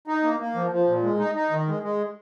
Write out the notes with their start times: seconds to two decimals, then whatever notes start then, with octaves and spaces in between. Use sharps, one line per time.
0.07 D#4
0.23 A#3
0.40 A#3
0.55 F3
0.71 F3
0.87 A#2
1.03 G#3
1.19 D#4
1.35 D#4
1.51 D#3
1.67 G#3
1.83 G#3